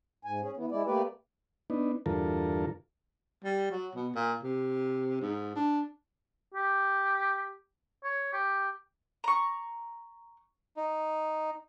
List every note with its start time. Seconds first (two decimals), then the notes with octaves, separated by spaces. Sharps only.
0.25 G#2 G#5
0.42 C#4 G#4
0.57 E3 B3
0.72 G#3 E4 D5
0.86 A3 A#3 G4 B4 D5
1.70 B3 D4 D#4
2.06 E2 G2 D3 F4 A4 A#4
3.45 G3
3.71 F#3
3.95 B2
4.15 A#2
4.43 C3
5.21 G#2
5.56 D4
6.54 G4
8.04 C#5
8.33 G4
9.24 A#5 C#6
10.77 D#4